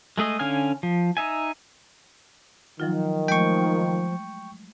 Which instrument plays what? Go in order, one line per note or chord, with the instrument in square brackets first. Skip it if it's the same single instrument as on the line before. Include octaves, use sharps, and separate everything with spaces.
[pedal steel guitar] G#3 A3 G#4 D#5
D3 C#4 F5 G#5 F6
F3
D#4 E5 G#5
[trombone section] D#3 [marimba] F3 F#3 F4
[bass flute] F3 [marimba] G#3 A3 [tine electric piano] G5 C#6